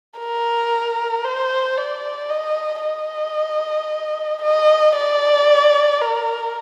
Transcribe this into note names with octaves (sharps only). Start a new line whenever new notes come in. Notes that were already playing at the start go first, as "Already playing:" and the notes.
A#4
C5
D5
D#5
D#5
D#5
D5
A#4